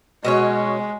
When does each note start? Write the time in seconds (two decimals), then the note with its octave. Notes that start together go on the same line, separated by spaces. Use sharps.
0.25 B2 G#3 C#4 F#4 C#5